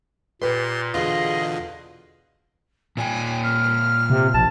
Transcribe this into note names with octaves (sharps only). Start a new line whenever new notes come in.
A#2 G4 B4 C6
E2 B2 D3 F4 G#4 D#5
A#2 D5 G5 G#5
F6
C3
A#1 A5